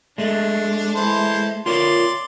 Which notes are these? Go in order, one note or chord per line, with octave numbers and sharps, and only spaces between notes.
G#3 A3 D4
E3 C5 A5
F4 A#4 C#5 D5 C6